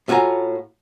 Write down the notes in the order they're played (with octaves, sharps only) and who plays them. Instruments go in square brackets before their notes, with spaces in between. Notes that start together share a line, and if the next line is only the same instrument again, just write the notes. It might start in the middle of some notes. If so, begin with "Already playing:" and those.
[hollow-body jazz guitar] A2 F4 F#4 C5 G#5 A#5